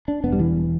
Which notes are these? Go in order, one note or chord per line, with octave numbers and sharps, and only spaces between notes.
D4
E1 B3
G3
E3